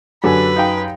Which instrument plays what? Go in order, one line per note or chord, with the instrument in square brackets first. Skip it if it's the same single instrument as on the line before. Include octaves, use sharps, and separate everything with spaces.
[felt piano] F#2 G4 G#5 [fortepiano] D3 [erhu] B4
[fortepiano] D#4 F5 G5